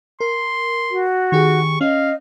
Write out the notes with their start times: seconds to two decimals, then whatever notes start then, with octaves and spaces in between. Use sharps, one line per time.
0.21 A#4 C6
0.90 F#4
1.32 D#3 G4 G#4 C#6
1.81 C#4 D#5 F5